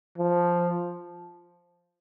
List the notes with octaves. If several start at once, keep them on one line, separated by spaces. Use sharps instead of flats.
F3